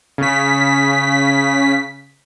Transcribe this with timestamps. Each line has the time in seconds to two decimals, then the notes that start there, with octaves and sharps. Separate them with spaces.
0.18 C#3 B6